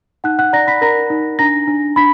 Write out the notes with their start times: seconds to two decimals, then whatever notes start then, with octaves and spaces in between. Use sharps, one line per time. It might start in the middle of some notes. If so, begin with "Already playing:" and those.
0.24 D#4 F#5 F#6
0.39 F#5 F#6
0.53 D5 A#5 A#6
0.67 B5 B6
0.81 A#4 A#5 A#6
1.10 D#4
1.39 D4 A#5 A#6
1.67 D4
1.96 D4 B5 B6